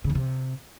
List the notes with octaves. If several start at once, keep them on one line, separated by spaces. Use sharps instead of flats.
C#3
E2
C3